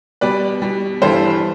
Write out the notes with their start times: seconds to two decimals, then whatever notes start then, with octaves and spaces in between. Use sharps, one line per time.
0.21 B2 G3 B4 D5
0.62 B2 G3
1.02 G2 E3 G3 A4 C5